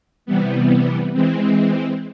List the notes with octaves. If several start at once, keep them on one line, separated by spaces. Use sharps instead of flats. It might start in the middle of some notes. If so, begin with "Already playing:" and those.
C3 E3 G3 B3
E3 G#3 C4